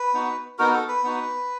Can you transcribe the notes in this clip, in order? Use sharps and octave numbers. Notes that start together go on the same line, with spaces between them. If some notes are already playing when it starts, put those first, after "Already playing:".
Already playing: B4
B3 D#4 F#4
B3 D#4 F#4 A#4
A4
B4
B3 D#4 F#4